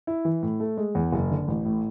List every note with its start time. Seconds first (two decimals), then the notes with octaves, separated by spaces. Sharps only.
0.07 E4
0.25 E3
0.42 A2
0.60 A3
0.77 G#3
0.95 E2
1.12 F#1
1.30 D3
1.48 A1
1.65 A2